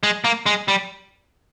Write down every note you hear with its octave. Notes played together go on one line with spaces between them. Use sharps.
G#3
A#3
G#3
G3